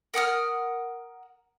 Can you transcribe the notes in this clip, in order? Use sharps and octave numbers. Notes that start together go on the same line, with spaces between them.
A#4 F#5 D#6 F6